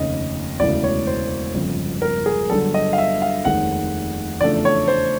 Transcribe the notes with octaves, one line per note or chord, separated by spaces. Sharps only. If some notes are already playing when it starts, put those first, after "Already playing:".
Already playing: F1 D#2 C#3 D#5
E1 D2 C#3 E3 D5
C#5
C5
G1 F2 C#3
A#4
G#4
G1 G2 D3 F#3 A4
D#5
F5
E5
F5
F1 D#2 D#3 G#3 F#5
E2 C#3 F3 A3 D4 D5
C#5
C5